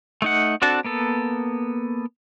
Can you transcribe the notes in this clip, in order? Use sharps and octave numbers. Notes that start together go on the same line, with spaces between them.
A3 D#4 F#5
C4 D4 F#4 A4 A5
A#3 B3 A4